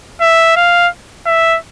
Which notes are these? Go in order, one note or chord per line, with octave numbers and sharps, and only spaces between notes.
E5
F5
E5